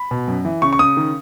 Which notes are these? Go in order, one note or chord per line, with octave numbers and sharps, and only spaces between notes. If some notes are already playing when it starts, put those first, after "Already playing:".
Already playing: B5
B2
F#2
E3
C#3 C#6
C#6
C#3 D#6
D#3